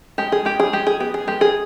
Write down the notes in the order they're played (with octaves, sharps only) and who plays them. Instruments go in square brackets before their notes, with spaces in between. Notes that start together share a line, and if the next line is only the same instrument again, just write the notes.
[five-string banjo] G#3 G4
G#4
G#3 G4
G#4
G#3 G4
G#4
B3 G4
G#4
G#3 G4
G#4